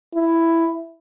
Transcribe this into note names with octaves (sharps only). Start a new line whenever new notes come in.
E4